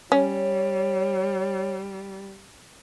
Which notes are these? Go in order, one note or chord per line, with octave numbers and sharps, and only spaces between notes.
G3 C#4 C#5